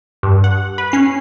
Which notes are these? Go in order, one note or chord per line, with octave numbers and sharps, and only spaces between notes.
G2
F#5
B4
C#4 C7